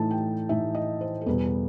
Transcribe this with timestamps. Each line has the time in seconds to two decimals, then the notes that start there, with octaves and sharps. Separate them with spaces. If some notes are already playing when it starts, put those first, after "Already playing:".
Already playing: A2 E3 A3 D#4 A5
0.11 G5
0.49 A2 E3 A3 D#4 E5
0.75 D#5
1.01 C5
1.21 A4
1.26 E2 B2 G3 B3 B4
1.46 A4